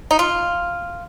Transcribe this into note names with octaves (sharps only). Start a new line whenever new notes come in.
D#4
F4